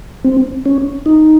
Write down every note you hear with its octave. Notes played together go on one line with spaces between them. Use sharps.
C4
C#4
D#4